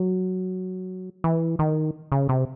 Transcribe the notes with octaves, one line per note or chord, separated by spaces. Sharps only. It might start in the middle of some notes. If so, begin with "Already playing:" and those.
Already playing: F#3
E3
D#3
C#3
C3